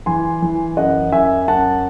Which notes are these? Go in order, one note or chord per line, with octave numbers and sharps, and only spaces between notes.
E3 G#5 C6
E3
F#2 D#5 F#5
F#2 E5 G#5
F#2 F#5 A5